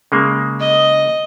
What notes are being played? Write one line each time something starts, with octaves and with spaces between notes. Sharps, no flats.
C#3 G#3 A#3
D#5